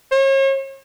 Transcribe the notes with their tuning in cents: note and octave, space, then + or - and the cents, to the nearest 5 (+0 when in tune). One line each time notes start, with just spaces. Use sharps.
C#5 -40